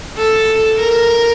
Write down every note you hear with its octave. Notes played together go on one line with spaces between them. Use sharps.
A4
A#4